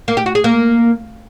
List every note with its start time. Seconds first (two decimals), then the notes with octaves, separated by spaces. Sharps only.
0.08 A#3
0.17 G4
0.26 F#4
0.35 G#4
0.44 A#3